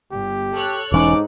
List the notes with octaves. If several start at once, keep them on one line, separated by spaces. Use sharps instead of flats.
G1 G4
A4 C#5 F#6
E1 G#2 E3 C#4 D#4 D6